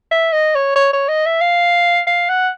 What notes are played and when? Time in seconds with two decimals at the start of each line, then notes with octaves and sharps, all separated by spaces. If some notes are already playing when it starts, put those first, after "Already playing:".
0.11 E5
0.33 D#5
0.55 C#5
0.76 C#5
0.93 C#5
1.08 D#5
1.26 E5
1.41 F5
2.07 F5
2.29 F#5